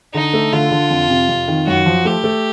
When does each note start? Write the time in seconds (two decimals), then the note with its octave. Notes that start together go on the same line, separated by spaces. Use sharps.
0.14 D3 D#4
0.34 A3
0.52 D3 F4
0.71 D3
0.90 F2
1.10 C3
1.29 F2
1.48 D#3
1.66 F#2 F#4
1.86 F3
2.05 A3 G4
2.24 A3